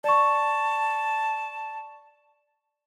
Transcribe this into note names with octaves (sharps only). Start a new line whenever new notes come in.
D5 A5 C#6